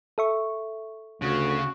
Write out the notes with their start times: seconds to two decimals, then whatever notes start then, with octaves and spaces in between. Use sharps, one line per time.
0.18 A4 E5 C#6
1.22 D2 C#3 F#4